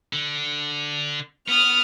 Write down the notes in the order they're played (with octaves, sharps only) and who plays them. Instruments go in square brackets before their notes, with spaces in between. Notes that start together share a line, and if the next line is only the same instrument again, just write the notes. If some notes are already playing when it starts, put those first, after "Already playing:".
[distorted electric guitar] D3
[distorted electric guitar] B3 [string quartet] D#6 F6